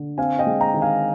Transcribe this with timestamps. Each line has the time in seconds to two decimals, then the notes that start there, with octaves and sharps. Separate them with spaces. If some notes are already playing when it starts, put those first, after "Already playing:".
Already playing: D3
0.18 C4 F5 G#5
0.39 D#5 G5
0.47 G#3
0.61 G5 A#5
0.74 D#3
0.82 F5 G#5